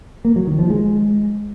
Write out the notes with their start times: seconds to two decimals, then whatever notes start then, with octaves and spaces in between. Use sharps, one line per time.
0.25 A#3
0.36 F#3
0.47 D#3
0.59 F3
0.70 G#3